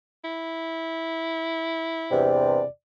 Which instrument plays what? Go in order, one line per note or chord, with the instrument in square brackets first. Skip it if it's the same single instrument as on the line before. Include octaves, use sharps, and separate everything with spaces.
[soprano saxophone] E4
[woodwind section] E2 G2 C3 [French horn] D5